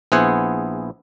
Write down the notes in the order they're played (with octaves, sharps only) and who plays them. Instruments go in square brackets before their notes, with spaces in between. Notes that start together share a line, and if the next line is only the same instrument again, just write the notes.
[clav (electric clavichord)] A#1 B3 E4 G#4 C5 F#5